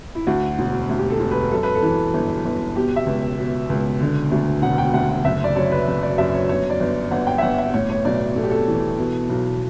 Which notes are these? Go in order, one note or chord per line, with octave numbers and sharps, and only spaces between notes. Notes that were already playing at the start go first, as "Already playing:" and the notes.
E4
D2 F#4
E1
D2
G4
A4
E1
B4
F#2 A4
B4
A4
E3
G1
G1
B2 G4
E5
C#2
B2
C#2
D3
D2
E1 F#5
G5
D2 F#5
F#5
F#1 E5
D5
F#2 C#5
B4
F#1
D5
F#2 E5
C#5
G1 C#5
D5
G1
G1 F#5
G5
E5
G1 F#5
E5
A2 C#5
C#5
B1 D5
B1 A4
G4
A4
E3
B2
B1